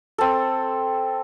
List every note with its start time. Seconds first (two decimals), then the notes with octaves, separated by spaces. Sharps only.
0.18 C4 A4